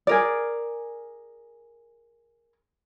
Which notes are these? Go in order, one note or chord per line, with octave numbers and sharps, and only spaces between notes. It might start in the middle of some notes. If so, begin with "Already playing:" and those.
G#4 A#4 D5